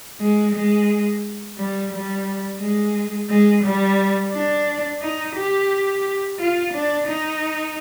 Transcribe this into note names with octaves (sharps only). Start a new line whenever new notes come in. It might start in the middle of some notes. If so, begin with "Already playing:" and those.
G#3
G#3
G3
G3
G#3
G#3
G3
D4
D#4
G4
F4
D4
D#4